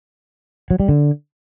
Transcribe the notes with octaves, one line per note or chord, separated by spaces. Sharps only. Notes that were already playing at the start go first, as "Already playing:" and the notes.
F#3
G3
D3